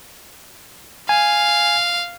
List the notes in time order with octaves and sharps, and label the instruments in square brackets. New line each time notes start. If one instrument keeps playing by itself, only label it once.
[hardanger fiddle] F5 [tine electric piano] G#5